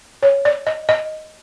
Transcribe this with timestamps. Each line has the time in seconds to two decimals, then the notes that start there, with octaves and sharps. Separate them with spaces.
0.23 C#5
0.45 D5
0.67 D#5
0.89 D#5